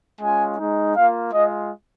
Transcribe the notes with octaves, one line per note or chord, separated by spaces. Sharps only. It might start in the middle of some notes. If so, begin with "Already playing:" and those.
G#3 C#4 F4 G#5
G#3 D#4
A#3 F4 F5
G#3 F4 D#5